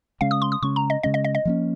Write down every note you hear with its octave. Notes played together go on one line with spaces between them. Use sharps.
C#3 G#3 C#4 F5
D#6
C6
D#6
C#3 G#3 C#4 C#6
A#5
D#5
C#3 G#3 C#4 D#5
D#5
D#5
D#5
F3 A#3 C#4